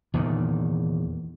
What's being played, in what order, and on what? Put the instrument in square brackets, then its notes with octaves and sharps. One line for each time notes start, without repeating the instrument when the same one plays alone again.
[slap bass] E2 A#2 D#3